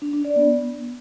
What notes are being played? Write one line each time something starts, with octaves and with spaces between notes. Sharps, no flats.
D4
D4
D5
B3